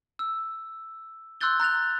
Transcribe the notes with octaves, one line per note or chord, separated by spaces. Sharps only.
E6
C6 E6 F#6 G6 A6 G7
A#5 F#6 A6 F7